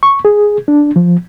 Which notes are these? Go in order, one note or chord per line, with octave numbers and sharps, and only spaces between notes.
C#6
G#4
D4
F3